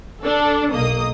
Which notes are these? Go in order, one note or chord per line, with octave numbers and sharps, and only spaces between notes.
D4 A4
B1 A#3 D#5 D#6